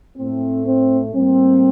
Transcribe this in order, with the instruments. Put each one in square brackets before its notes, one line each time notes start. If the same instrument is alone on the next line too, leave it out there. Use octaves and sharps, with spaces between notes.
[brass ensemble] A2 A3 C4
C4
A2 G3 A#3 C4